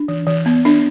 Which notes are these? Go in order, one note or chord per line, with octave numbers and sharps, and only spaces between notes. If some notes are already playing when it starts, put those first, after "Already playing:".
Already playing: D4
E3
E3
B3
D4